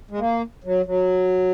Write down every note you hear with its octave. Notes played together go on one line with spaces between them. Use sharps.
G#3
A#3
F#3
F#3